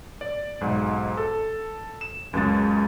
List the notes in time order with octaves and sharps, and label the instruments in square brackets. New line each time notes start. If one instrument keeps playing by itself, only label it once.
[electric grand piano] D5
B1 G#2
A4
E7
C#2 F#2 G#3 A6